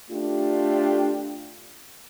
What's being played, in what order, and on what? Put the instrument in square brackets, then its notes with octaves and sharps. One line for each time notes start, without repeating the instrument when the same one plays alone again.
[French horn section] A3 D4 F4 G4